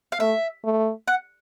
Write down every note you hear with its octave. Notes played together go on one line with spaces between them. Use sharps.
F5
A3 E5
A3
F#5